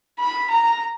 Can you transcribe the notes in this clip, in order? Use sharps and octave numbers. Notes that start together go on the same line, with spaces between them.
B5
A#5